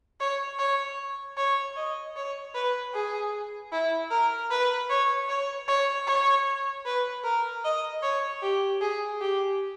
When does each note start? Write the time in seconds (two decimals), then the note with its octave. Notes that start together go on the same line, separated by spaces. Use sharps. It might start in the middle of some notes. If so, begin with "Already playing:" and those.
0.20 C#5
0.59 C#5
1.37 C#5
1.76 D#5
2.16 C#5
2.55 B4
2.94 G#4
3.72 E4
4.11 A#4
4.51 B4
4.90 C#5
5.29 C#5
5.68 C#5
6.07 C#5
6.86 B4
7.24 A#4
7.64 D#5
8.03 C#5
8.42 G4
8.81 G#4
9.21 G4